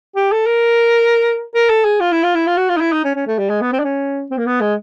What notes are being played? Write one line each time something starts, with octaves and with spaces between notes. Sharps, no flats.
G4
A4
A#4
A#4
A4
G#4
F4
E4
F4
E4
F4
F#4
F4
D#4
E4
D#4
C#4
C#4
A3
G3
G#3
B3
C4
D4
C#4
C4
A#3
B3
G#3